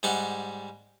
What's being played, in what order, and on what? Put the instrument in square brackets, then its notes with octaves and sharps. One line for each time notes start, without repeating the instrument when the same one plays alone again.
[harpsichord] G#2 G3 D5 F#5